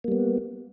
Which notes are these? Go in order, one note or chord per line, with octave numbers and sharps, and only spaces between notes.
G3 A#3 B3